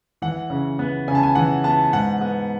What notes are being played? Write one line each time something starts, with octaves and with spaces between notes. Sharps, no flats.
E3 F#5
C#3
B3
C#3 G#5
A5
G#5
E3 F#5
B3 A5
G#2 F#5
B3